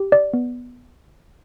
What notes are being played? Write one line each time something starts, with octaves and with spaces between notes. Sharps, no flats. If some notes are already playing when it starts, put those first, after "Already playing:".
Already playing: G4
D5
B3